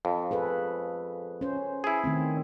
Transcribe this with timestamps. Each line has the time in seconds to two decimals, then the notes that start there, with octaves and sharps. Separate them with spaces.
0.05 F2
0.31 G#4 A4 B4
1.41 C#4 C5
1.84 E4 G#4
2.04 D#3 A3 C4